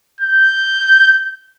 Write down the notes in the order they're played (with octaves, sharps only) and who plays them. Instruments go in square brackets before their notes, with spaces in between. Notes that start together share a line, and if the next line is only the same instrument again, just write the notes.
[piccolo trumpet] G6